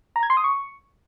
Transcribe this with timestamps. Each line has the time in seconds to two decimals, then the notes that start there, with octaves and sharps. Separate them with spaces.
0.16 A#5
0.23 G#6
0.30 C6
0.37 D#6
0.44 C#6